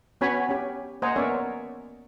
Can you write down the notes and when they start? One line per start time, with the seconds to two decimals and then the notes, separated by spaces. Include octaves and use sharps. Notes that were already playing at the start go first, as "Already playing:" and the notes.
0.21 B3 C#4 F#4 C#5 G#5 B5
0.49 C#4 G4
1.02 A#3 C5 D#5 F#5 G#5 A#5
1.16 B3 C#4 A#4 C#5 D5 E5